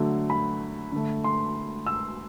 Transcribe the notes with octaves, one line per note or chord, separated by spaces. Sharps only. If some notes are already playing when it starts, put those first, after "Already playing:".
Already playing: D3 F#3 A3
B5
D3 A3
C6
E6